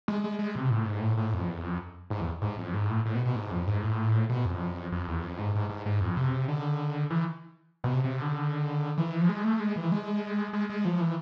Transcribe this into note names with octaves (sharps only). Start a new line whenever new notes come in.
G#3
G#3
G#3
C3
A2
G#2
A2
A2
F2
E2
F2
G#2
E2
G#2
F2
G#2
A2
A2
B2
B2
G#2
F2
G#2
A2
B2
F2
F2
E2
F2
G#2
G#2
G#2
G#2
F2
C3
D3
E3
B2
C3
C3
D3
E3
F3
G#3
A3
G#3
E3
G#3
G#3
G#3
F3
E3